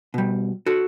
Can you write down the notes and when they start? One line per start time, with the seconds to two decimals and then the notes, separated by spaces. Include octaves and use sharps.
0.14 B2 G3
0.66 F#4 A4